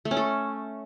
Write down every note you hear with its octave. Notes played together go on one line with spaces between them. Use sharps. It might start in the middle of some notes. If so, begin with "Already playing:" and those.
A3
C#4
A4